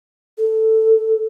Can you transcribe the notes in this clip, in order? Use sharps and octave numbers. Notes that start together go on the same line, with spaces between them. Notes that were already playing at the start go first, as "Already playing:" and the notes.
A4